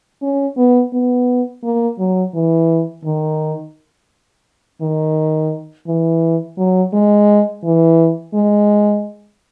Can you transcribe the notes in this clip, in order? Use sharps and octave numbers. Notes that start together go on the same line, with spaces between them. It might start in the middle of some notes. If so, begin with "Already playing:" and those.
C#4
B3
B3
A#3
F#3
E3
D#3
D#3
E3
F#3
G#3
E3
G#3